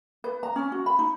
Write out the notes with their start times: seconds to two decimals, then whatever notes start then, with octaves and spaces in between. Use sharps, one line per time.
0.24 B4
0.43 A#5
0.56 C#4
0.72 F#4
0.86 B5
0.99 D#4